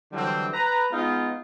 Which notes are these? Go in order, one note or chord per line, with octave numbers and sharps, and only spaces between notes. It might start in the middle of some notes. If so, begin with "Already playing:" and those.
D3 E3 F#3 G3 C4
B4 A#5
G#3 B3 D#4 F4